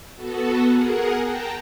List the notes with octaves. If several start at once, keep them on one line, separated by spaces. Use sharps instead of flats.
B3 F#4 A4
G#4 A#4 F#5
G5 A5 A#5